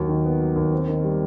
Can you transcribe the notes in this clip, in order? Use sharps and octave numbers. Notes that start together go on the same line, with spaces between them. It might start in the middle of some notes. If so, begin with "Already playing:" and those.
Already playing: D#2 F#3
D#3
B3
F#3
D#2
C4
D#3
G3